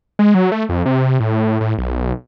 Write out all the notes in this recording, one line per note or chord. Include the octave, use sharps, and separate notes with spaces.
G#3
F#3
A3
F2
C3
A2
A2
B1